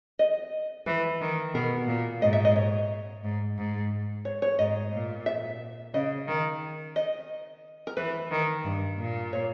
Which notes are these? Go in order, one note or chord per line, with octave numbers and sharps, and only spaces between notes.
D#5
E3 B4
D#3
B2 A#4
A#2
G#2 D#5
E5
D#5
C#5
G#2
G#2
C#5
C#5
G#2 D#5
A#2
E5
C#3 D#5
D#3
D#5
A#4
E3 B4
D#3
G2
A#2
C#5